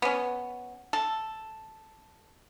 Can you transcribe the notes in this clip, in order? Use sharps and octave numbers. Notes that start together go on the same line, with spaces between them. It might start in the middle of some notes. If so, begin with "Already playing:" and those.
B3 C#4
A4